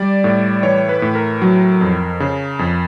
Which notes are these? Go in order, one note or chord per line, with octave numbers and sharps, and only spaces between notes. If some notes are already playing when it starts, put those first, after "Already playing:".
Already playing: G3 D5
A2
E3 C#5
B4
A2
A#4
F#3
F2
C#3
F2